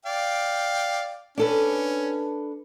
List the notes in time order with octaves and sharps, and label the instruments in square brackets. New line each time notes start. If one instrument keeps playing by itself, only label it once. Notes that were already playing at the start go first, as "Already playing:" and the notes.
[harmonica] D5 F5 G5
[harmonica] C#4 [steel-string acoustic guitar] D4 A4 B4